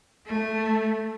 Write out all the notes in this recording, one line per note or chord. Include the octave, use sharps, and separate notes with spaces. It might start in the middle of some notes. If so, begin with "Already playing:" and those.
A3